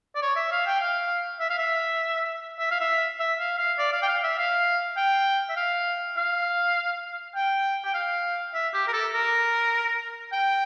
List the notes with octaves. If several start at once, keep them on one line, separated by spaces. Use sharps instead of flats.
D5
C#5
E5
F5
G5
F5
E5
F5
E5
E5
F5
E5
E5
F5
F5
D5
F5
G5
F5
E5
F5
G5
E5
F5
F5
G5
G5
F5
E5
G4
A#4
A4
A#4
G5